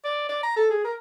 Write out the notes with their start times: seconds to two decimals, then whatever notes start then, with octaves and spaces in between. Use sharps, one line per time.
0.04 D5
0.29 D5
0.43 A#5
0.56 A4
0.70 G#4
0.84 A#4